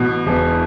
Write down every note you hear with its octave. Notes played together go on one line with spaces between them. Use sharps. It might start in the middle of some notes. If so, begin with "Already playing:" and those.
Already playing: A1 B2
E1